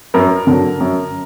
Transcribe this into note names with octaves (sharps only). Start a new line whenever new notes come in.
F#2 A#4
D3 F#3
F#2